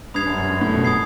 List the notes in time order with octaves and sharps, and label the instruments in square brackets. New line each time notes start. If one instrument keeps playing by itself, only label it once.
[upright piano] G2 [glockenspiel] B5 D#6 G#6 C7 F7
[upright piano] F#2
F#2
G2
A2
B2
[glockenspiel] D#6 G#6 C7